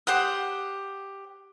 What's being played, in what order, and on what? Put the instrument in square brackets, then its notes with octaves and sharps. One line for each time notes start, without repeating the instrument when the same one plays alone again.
[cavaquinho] G4 C5 F#5 D#6